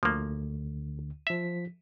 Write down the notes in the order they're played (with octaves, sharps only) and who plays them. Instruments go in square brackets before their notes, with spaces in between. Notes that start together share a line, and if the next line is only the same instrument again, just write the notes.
[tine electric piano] D2 D3 [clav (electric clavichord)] F3 A#3
[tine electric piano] F3 B6 [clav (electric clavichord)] E5